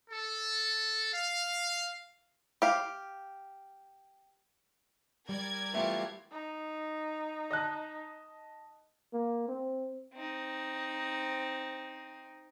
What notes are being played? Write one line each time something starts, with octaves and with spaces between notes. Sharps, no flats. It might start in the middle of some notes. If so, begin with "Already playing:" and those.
A4
F5
G4 F5
G3 A#4 D5 G#6
E3 A3 B3 F4 G4
D#4
D#5 A5 F#6
A#3
C4
C4 D#4